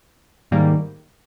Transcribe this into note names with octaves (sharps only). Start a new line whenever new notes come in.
G#2 D#3 G3 A#3